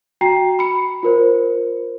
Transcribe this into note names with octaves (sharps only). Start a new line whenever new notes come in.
F#4 G5 A#5 C7
B5 C#7
F4 A#4 C5